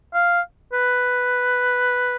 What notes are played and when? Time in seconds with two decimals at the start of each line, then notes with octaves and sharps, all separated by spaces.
0.14 F5
0.73 B4